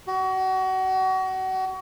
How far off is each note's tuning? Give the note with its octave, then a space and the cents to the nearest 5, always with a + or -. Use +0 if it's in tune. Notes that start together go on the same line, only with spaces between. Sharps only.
F#4 +30